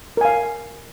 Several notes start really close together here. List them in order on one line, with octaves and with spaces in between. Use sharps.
A#4 G#5 F5